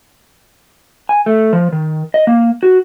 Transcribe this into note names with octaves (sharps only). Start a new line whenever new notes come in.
G#5
A3
F3
D#3
D#5
A#3
F#4